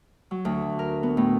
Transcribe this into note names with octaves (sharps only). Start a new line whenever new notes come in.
F#3
D2
A#4
B3
A2